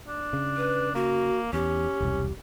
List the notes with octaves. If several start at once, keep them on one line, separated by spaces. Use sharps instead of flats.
D4
C#3
B4
A#3 F#4
E2 C#4 G4
E1 C2